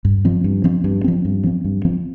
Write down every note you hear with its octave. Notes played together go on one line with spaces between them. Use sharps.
G2
F3 C4
G2
F3 C4
G2
F3 C4
G2
F3 C4
G2
F3 C4